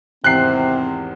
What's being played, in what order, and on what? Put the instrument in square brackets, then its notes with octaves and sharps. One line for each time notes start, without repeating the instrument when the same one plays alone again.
[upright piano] G#1 E2 G4 [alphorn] C3 [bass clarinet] C4 [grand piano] F#6 C7